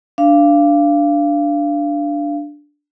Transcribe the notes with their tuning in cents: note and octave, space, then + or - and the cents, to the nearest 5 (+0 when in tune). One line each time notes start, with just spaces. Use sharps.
D4 +0 F5 -20